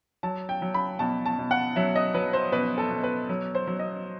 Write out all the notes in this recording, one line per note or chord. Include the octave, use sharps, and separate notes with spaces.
F#3 A5
G5
F#3
B5
B2 A5
A5
B2
F#5
F#3 E5
D#5
F#3 B4
C5
B2 B4
A4
B2
B4
F#3
C5
F#3
D#5